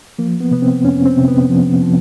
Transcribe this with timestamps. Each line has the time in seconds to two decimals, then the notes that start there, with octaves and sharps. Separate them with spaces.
0.19 F3 A#3
0.40 B3
0.51 C3 B3
0.62 C4
0.84 F2 C#4
1.06 C4
1.17 C3
1.28 B3
1.49 F3
1.82 F3